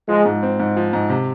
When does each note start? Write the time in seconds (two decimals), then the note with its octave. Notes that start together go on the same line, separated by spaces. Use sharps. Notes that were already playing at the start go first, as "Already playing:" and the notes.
0.08 F3 G#3
0.26 G#2
0.43 C4
0.60 G#2
0.77 F3
0.93 G#2
1.10 C3